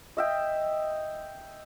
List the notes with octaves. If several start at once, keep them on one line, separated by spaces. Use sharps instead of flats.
D#5 E5 G5